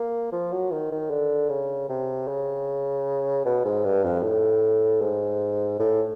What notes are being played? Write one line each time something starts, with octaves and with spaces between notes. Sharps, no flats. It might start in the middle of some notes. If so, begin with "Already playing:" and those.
Already playing: A#3
F3
F#3
D#3
D#3
D3
C#3
C3
C#3
B2
G#2
G2
F2
A2
G#2
A2